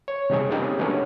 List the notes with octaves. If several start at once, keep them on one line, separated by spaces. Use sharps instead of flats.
C#5
C3 G3 D#4 G#4 C#6
A#3 C4 C#4 D#4 G4
F#3 A3 B3 C#4 D4